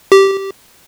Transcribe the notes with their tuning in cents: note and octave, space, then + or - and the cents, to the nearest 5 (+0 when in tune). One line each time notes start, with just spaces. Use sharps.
G4 -10